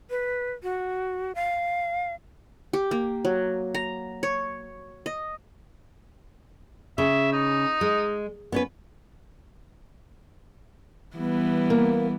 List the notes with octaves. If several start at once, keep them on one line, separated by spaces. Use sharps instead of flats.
B4
F#4
F5
G4
A#3
F#3
A#5
C#5
D#5
C#3 E5
D#4
G#3
B3 C#4 B4
E3 G3 B3
A#3